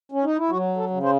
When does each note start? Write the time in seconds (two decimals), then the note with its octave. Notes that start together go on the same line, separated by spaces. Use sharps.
0.12 C#4
0.24 D#4
0.37 E4
0.50 F#3 F#4
0.77 A4
0.90 C#3
1.03 C5